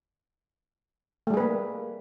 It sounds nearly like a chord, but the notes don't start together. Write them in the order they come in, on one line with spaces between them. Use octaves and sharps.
A3 G3 G#4 B4 A#3